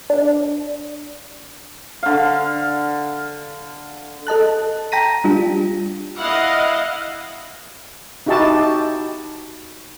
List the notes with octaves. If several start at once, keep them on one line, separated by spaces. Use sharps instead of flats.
D4
D3 F5
A4 D#5 A5 F#6
G5 A5 A#5 A#6 B6 D#7
G3 D4 F4 G4
E4 D#5 F5 F#5
D#4 E4 F#4 G4 D#5 A5